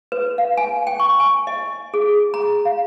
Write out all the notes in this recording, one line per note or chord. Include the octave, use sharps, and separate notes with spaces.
B4
F5
G#5
G5
C#6
G#5
D#5
G#4
A#5
F5